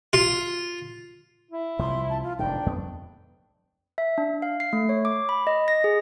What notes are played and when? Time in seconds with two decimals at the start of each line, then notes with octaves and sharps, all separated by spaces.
0.13 F4
1.51 E4
1.79 C2 C3 F3 C6
2.10 A5
2.23 F4
2.39 F1 G#2 D#3 D4 G5
2.66 F2 B3
3.98 E5
4.18 D4
4.42 F5
4.60 C7
4.73 A3
4.89 C#5
5.05 D6
5.29 B5
5.47 D#5
5.68 A#6
5.84 G#4